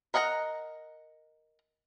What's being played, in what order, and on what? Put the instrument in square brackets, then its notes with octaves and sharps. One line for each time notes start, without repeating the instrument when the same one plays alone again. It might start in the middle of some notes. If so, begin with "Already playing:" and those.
[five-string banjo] A#4 D#5 F#5 G#5 A#5